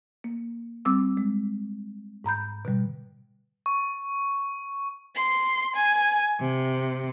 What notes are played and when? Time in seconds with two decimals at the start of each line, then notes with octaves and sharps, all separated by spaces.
0.24 A#3
0.85 G3 C4 D6 E6
1.17 G#3
2.24 G#2 A#5 B5 G6
2.65 B2 D3 G3
3.66 C#6
5.14 C6
5.76 G#5
6.40 C3